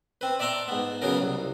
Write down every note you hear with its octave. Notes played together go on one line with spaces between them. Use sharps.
C4 B4
D5 E5 A5 A#5 C6 C#6
G#2 B3
C#3 F#3 B3 C#4 A#4
C2